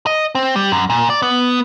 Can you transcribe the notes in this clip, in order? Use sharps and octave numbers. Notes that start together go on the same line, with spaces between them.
D#5
C4
G3
F#2
A#2
D5
B3